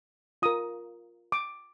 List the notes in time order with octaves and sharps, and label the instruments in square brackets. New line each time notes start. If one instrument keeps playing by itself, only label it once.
[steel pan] F4 A#4 D#6
D6